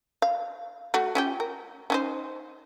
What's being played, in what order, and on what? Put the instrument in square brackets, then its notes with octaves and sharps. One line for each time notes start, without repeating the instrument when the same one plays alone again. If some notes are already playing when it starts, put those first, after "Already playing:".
[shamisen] F5
A3 F#4
C#4 F4 G4
A#4
C#4 D#4 C5